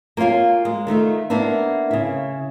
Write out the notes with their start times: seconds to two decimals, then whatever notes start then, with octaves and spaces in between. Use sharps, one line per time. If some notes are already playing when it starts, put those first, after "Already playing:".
0.17 A#3 F4 C#5 F5 G#5
0.65 G#3
0.87 D#3 A3 D#4 F4
1.30 A#3 B3 D4 E4
1.91 C#3 E4